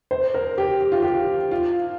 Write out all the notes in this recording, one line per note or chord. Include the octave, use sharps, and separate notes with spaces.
C5
A#4
G4
G4
F4
G4
F4